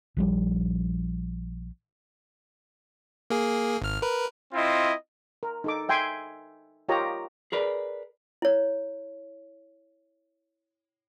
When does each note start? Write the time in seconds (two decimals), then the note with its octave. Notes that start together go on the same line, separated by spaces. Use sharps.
0.17 A#1 F3 G3
3.30 A#3 G#4
3.81 G#1 F6
4.02 A#4 B4
4.54 C4 E4 F4 D#5
5.43 A#4
5.64 D#4 A4 D6
5.89 E5 G5 G#5 C6
6.89 F4 G4 A#4 C#5 D#5 A#5
7.52 G#4 A#4 B4 D5
8.42 E4 C#5